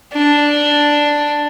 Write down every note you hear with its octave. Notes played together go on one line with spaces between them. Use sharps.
D4